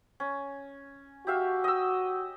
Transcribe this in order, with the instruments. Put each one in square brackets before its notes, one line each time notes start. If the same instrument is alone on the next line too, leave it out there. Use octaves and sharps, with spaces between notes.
[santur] C#4
[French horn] F#4 [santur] G4 E5 F5
[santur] D#5 E6